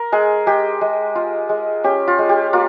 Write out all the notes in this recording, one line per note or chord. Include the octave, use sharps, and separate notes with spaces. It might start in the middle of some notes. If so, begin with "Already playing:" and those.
Already playing: A#4
G#3 G#4
G#3 G4
G#3
F4
G#3
C#4 G4
F4
G#3
G4
A#3 F4